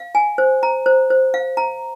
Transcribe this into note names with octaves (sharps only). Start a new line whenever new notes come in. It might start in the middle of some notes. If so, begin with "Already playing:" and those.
Already playing: F5
G#5
C5
A#5
C5
C5
F5
A#5